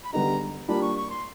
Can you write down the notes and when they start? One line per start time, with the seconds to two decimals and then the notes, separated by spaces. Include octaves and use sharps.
0.05 B5
0.13 D3 G3 B3 D#4 G#4 A#5
0.68 G3 A#3 D4 F4 B5
0.82 C#6
0.96 C#6
1.10 C6